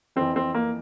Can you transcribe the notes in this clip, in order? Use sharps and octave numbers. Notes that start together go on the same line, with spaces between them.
F2 E3 C4
C4
A#3